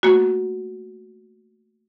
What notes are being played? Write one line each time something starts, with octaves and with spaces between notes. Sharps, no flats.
A3 A#3 F#4